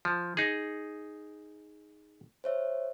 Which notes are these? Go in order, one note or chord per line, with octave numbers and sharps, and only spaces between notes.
F3
D#4 G#4
C5 C#5 E5